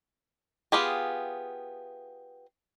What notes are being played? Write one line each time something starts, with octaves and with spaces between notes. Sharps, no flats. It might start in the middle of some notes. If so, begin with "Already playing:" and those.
B3 F4 G4 G#4